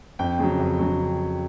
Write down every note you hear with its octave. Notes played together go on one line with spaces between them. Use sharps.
F2 G5
C#3 F#3
F2
C#3 F#3